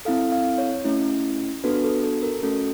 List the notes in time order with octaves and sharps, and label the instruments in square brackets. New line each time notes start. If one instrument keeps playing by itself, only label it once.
[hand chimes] C4 E4 A4 F5
F5
C#5
A3 C#4 E4
B3 D4 F#4 A4 B4
A4
A4
A#4
A3 C#4 F#4 A4